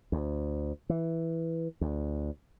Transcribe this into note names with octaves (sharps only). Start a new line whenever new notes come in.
D2
E3
D2